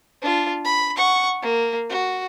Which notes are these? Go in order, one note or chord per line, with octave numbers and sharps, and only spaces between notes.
D4 F4
B5
F#5 C#6
A#3
F#4